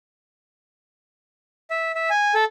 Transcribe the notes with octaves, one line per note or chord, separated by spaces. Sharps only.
E5
E5
G#5
A4